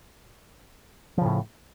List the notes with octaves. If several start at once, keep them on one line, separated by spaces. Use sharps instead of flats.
A2 C#3 F3